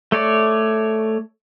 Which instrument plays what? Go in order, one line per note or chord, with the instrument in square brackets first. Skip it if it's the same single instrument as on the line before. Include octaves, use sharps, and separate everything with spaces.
[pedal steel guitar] A3 C#5 D5